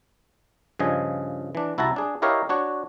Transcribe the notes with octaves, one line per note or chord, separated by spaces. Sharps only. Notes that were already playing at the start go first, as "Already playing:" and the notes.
G2 C#3 F3 D#5 G#5
E3 D4
C2 E4 F#4 A5 A#5
D4 G#4
E4 G4 A#4 C#5 D#5 F5
D4 F#4 C#5